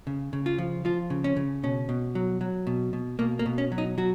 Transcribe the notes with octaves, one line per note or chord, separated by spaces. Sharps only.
C#3
C#3
F4
F3
F3 F4
C#3
C#4
C#3
B2 C#4
B2
F#3
F#3
B2
B2
B2 A#3
A#3
B2
C#4
F#3
D#4
F#3 F#4